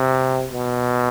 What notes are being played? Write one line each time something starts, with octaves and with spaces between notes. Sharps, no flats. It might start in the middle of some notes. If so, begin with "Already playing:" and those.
Already playing: C3
B2